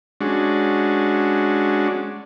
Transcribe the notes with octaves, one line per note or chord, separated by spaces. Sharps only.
G#3 C#4 D4 F#4